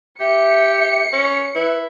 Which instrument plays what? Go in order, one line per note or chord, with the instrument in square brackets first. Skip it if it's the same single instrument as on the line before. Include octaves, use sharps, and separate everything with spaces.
[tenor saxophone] G4 [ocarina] E5 [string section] C#7
[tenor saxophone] C#4
[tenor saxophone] E4 [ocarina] B4